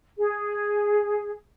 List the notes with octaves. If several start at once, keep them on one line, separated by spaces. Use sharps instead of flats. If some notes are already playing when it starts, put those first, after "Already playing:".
G#4